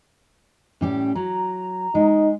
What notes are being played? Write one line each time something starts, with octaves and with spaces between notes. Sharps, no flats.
A2 G3 C#4 G4
F#3 A#5
G#3 D#4